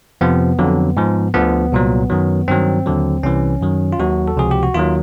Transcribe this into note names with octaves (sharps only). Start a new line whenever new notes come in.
F2 C3 F3 B3
F2 D3 F#3
G#2 F3
D2 D3 F3 B3
C2 A#2 F#3
F#2 D#3 F#3
G2 D#3 F#3 C4
D#2 D3 F#3
C2 C3 E3 C#4
F#2 D#3 F#3
F4
D#2 D#3 F#3 F#4
A4
C#2 C3 F3 G#4
G4
F#4
D#2 D#3 F#3 F4